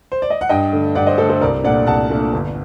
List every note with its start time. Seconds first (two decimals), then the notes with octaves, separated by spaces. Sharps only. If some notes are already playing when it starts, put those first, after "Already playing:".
0.12 C5
0.22 D5
0.30 D#5
0.41 F#5
0.49 G2 D#5 G5
0.73 D3 A3
0.95 G2 D5 F#5
1.07 C5 D#5
1.18 D3 A3 A4 C5
1.29 A4 C5
1.41 C2 A#4 D5
1.64 A#2 A3 D4 D5 F#5
1.87 C2 F#5 A5
2.10 A#2 A3 D4
2.32 G1